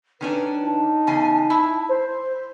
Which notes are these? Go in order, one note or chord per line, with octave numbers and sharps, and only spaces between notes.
D#3 C#4 D4 B4
D#4 A5
E2 C#3 G#5
E4
C5